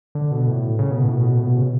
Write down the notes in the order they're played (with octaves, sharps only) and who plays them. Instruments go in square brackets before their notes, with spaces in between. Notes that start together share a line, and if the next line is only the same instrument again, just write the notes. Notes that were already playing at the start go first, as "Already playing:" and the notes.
[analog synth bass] D3
B2
A2
C#3
B2
A2
B2
A2
B2
C#3